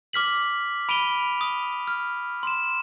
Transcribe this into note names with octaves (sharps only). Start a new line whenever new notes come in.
D6 F6 B6 F#7
B5 D7 D#7 F7 G7
D#6
F6
C6 E7